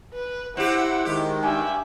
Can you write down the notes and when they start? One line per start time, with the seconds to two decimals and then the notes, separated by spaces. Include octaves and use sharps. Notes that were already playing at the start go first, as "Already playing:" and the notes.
0.14 B4
0.57 C4 E4 G4 F#5
1.05 D#3 G#3 G4
1.43 G2 G4 E5 G#5